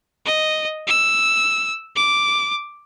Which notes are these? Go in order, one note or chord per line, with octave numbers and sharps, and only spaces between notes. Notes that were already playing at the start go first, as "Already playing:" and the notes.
D#5
E6
D6